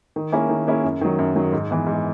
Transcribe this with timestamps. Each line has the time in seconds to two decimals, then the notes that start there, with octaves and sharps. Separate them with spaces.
0.16 D#3
0.32 A#3 C#4 E4 G#4
0.49 D#3
0.67 A#3 C#4 E4 G#4
0.84 F#2
1.01 D#3 F#3
1.19 F#2
1.36 D#3 F#3
1.52 G#2
1.70 E3 B3
1.87 G#2